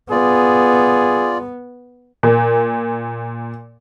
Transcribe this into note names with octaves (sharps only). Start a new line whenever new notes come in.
B3 F4 G#4 D5
A#2